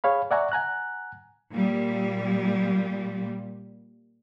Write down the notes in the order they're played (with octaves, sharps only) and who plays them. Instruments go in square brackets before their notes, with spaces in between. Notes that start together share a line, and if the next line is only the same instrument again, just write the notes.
[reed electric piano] G#4 C#5 F5 B5
D5 E5 F#5 G#5 A#5 C#6
F#5 G#5 A#5 F#6
[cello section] A#2 G3